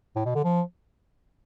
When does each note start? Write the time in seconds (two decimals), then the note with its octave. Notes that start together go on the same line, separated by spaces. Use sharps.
0.16 A2
0.25 B2
0.35 D3
0.44 F3